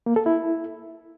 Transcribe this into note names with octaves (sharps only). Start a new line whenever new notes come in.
A#3
A4
E4